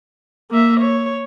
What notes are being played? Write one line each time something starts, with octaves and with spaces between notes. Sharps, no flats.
A#3 E5
C#5